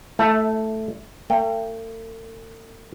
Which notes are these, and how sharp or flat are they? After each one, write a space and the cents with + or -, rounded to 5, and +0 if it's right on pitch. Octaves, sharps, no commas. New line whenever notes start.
A3 +0 E4 -20 A5 +5
A3 +45 G5 +0